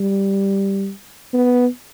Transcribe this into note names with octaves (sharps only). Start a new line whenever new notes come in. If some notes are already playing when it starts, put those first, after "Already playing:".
Already playing: G3
B3